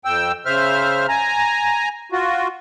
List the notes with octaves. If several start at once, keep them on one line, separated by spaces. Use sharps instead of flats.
F2 G5 E6
C#3 C5 E5 F6
G#5 A#5
F4 F#4